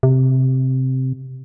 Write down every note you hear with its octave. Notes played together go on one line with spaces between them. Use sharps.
C3